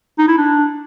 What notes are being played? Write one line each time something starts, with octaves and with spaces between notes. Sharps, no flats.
D#4
E4
D4